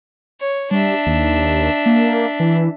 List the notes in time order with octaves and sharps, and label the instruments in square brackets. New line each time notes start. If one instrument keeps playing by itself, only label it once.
[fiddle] C#5
[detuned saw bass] G3 [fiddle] D4 E5
[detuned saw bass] D#2
A#3
E3